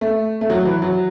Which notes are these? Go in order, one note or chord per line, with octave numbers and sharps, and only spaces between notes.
A3
A3
F#3
E3
F#3